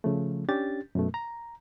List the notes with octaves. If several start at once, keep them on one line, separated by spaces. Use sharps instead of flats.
C#3 F3 A3
C#4 D4 G4 A6
F#2 B2 A3
A#5